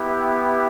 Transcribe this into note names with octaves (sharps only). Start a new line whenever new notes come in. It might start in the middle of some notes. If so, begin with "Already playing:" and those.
Already playing: B3 E4 G4